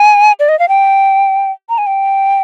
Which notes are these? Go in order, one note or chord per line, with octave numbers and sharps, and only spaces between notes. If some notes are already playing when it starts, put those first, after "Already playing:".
Already playing: G#5
D5
D#5
F5
G5
A#5
G#5
G5